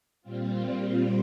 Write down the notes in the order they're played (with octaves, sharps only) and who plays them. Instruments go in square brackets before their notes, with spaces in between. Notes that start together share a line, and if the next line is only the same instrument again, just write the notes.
[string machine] A#2 G3 C4 F4